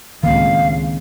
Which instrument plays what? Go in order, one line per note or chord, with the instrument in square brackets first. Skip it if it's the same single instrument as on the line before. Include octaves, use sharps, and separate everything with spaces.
[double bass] C#2 A2 [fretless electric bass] D#3 A#3 C4 [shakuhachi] F5